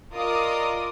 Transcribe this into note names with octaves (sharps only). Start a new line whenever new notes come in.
F4 A#4 D5 D#5 D6 D#6